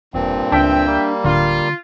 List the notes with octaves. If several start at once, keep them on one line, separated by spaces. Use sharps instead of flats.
E1 G2 A#2 C4
C#2 D4 E5 G5
G3 A#3
D1 D3 F4